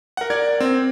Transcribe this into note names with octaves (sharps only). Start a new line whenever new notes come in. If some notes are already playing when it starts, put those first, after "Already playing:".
A#4 F#5
A#4 D5 G#6
C4